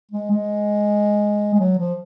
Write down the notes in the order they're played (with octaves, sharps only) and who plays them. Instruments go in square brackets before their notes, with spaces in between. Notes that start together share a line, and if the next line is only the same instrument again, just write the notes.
[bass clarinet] G#3
G#3
G#3
F#3
F3